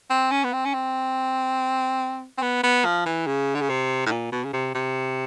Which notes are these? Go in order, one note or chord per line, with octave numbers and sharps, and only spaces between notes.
C4
C#4
B3
C4
C#4
C4
C4
B3
B3
F3
E3
C#3
D3
C#3
C3
A2
A#2
B2
C#3
C3
C3